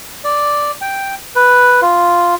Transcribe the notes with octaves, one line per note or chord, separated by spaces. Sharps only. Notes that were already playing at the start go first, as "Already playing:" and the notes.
D5
G5
B4
F4